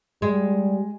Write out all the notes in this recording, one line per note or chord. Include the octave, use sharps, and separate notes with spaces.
G3 G#3